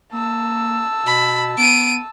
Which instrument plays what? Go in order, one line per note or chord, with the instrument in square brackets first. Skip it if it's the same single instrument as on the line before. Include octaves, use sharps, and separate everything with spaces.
[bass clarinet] A#3 [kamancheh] A5 E6
[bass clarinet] B2 [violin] B5
[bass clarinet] B3 [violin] D7 D#7